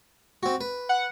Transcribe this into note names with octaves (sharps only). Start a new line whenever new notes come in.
C4 F#4
B4
F#5